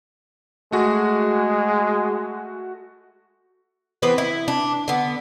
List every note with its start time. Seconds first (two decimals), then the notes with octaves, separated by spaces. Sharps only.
0.72 G#3 A3 F#4
4.02 E3 B3 C4 B4
4.18 E4
4.48 D4
4.88 D3 B3